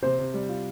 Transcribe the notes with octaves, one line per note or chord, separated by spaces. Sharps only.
C3 C5
C3
G3
F4